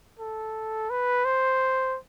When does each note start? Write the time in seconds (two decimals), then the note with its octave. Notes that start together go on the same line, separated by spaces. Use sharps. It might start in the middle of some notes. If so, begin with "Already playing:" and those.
0.19 A4
0.90 B4
1.25 C5